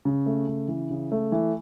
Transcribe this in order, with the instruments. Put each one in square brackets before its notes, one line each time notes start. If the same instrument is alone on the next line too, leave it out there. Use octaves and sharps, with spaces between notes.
[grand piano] C#3
A3
C#3
E3
C#3
A3
E3